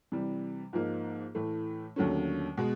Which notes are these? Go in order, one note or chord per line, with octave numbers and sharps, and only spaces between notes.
C3 E3 G3
G#2 F3 A#3 D#4
A2 E3 A3
D#2 D3 F#3 A3 C#4
B2 G#3